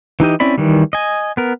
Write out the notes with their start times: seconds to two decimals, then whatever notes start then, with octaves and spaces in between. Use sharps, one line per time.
0.20 E3 D#4 G4 D#5
0.40 C4 C#4 E4 D5 B5
0.58 D#3 E3 G3
0.93 D#5 G#5
1.37 B3 A#4